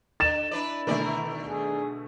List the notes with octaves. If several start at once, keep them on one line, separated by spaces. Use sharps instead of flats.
D3 A6 E7
D4 E4 B4 D5
B2 D3 D#3 A3 A#4 D5
G#4